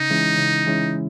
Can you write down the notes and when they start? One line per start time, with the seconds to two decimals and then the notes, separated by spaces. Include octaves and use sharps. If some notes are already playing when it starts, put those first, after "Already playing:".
Already playing: C#3 D#4
0.10 E3 G#3 C#4 E4
0.38 C#3
0.66 E3 G#3 C#4 E4